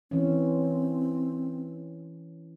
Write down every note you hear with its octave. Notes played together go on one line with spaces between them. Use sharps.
E3 C4 C#4